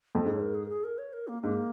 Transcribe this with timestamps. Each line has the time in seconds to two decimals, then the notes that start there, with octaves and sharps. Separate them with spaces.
0.15 F2
0.24 G#2 G#4
0.34 C#5
0.40 A#4
0.55 G#4
0.65 A#4
0.69 G#4
0.84 A#4
0.98 C#5
1.13 A#4
1.28 A#3
1.43 G#2 A#3